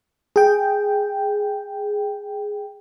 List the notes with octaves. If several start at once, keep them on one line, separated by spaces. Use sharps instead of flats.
G#4 G5